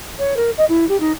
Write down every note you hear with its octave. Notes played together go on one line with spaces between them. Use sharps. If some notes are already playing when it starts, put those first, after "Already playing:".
C#5
A#4
D#5
E4
G4
D#4